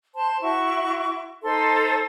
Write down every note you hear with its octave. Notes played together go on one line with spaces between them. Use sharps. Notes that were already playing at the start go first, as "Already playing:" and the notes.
C5 A5 C6
E4 F#4 C#6
D#4 A4 C5 C6